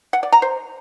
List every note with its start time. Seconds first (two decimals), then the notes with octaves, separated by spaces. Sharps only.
0.13 F#5
0.23 D5
0.32 A#5
0.42 C5